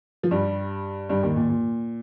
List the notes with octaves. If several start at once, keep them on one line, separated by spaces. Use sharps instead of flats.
F3
G2 G3
G2 G3
D#2 D#3
A#2
A#2